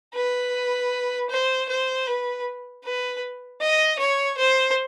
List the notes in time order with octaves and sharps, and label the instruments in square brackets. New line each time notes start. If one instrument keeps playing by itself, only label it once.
[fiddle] B4
C5
C5
B4
B4
D#5
C#5
C5